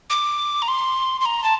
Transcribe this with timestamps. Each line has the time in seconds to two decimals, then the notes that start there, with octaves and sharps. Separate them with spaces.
0.10 D6
0.62 A#5
0.68 C6
1.21 C6
1.25 A#5
1.44 A5